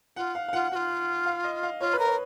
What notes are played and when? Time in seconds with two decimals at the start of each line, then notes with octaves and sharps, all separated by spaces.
0.16 F4 F#5
0.35 F5
0.48 F5
0.53 F4 F#5
0.72 F#4 F#5
0.75 F4
1.26 F5
1.44 D#5
1.63 F5
1.80 F4 C#5
1.93 B4
1.99 A#4
2.06 C#5